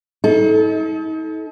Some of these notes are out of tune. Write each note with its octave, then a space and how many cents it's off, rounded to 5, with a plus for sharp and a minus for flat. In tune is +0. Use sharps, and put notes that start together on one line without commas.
D#4 +40 A4 -25